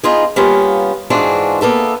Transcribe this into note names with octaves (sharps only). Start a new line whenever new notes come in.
B3 D#4 F4 G#4
G3 A#3 B3 C#4 F4
G#2 E3 D4 F4 F#4 G#4
A#3 B3 A4 E5